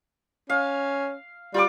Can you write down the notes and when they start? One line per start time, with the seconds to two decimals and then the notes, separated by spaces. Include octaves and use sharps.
0.50 C#4 F5
1.54 G3 F4 D6